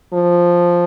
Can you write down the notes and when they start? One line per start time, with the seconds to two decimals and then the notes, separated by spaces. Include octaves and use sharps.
0.13 F3